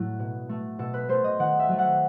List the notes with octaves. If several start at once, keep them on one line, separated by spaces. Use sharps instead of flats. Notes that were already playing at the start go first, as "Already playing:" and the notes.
Already playing: A2 F#3 A3
B2
A3
B2 A4
B4
A3 C5
D#5
D#3 F#5
E5
F#3 A3
F#5